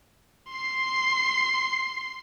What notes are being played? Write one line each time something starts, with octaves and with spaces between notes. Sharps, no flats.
C6 C7